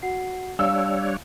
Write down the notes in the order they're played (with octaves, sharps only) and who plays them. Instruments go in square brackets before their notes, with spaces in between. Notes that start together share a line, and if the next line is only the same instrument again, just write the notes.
[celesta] F#4 F#5 C7
[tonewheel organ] G3 D4 C#5 [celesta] F5 [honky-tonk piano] E6